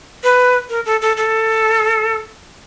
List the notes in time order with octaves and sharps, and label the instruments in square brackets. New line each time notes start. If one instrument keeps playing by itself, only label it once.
[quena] B4
A#4
A4
A4
A4